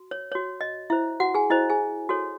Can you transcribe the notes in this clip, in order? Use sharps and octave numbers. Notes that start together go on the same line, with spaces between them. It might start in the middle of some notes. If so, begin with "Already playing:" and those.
Already playing: F#4
C#5
F#4 C#5
D#5
E4 C5 E5
F#4 F#5
G#4 G#5
E4 C5 D#5
G#4 G#5
F#4 A4 C#5